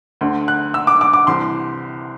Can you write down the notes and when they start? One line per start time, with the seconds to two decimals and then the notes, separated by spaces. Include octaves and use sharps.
0.21 D2 D3
0.48 F#6
0.74 E6
0.87 D6
1.01 D6
1.13 D6
1.27 C2 C3 E3 C6